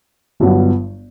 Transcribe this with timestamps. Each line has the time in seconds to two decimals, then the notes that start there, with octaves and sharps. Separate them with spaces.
0.40 G1 G2 F#3 B3